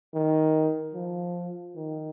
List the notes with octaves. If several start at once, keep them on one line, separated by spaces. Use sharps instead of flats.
D#3
F3
D#3